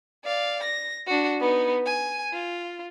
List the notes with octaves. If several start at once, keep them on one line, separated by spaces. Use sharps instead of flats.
D5 F5
A#6
D4 F#4
B3 D#4
G#5
F4